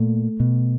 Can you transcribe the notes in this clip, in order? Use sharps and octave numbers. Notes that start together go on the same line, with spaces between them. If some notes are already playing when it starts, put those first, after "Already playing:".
Already playing: A#2 A3
B2